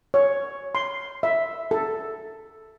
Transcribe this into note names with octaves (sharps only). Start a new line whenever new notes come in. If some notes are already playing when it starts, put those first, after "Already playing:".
C#5
C6
E5
A4